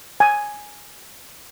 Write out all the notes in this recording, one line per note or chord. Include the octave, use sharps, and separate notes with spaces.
G#5